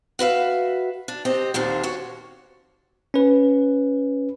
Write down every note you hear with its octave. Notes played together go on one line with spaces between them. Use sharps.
F#4 B4 E5 F5
D4
C4 G4 D#5
D#2 A#2 D3 C4 D4
F#4 C#5
C#4 B4